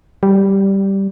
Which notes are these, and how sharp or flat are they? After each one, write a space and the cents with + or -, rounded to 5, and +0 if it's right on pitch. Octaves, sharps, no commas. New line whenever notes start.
G3 -5